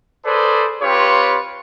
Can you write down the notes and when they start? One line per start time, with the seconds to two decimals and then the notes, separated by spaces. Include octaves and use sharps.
0.25 G#4 A4 B4 C5 D5
0.82 C4 F4 G4 B4 C#5